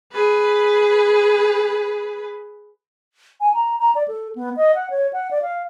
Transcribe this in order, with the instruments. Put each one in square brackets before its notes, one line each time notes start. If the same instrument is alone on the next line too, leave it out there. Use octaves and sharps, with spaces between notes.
[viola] G#4 B4
[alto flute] G#5
A#5
A#5
D5
A4
B3
D#5
F#5
C#5
F#5
D5
F5